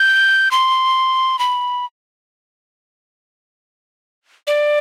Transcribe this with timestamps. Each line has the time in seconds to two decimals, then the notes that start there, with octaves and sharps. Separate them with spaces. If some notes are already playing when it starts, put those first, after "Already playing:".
Already playing: G6
0.51 C6
1.39 B5
4.47 D5